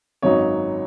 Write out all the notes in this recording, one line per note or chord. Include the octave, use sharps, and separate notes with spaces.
G#1 F#2 F#3 D#4 C#5